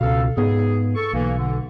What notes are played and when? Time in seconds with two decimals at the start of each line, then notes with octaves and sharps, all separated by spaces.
0.01 C#2 B2 A4 F5
0.37 G#2 B3 G#4
0.95 A4 C#6
1.13 B1 E3 A#3
1.38 D3